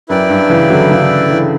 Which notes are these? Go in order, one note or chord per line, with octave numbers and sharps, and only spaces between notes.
F#2 E4 B4 D5 G5
G2
C#3 E3
D3 F#3
C#3 E3
C#3 E3